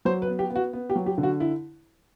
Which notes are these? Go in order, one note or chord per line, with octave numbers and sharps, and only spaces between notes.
F#3 C5
B4
B3
G4
B3
F#4
B3
G4
F#3
G4
D3
F#4
E4